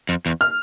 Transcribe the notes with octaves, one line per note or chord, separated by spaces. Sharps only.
F2
E2
F6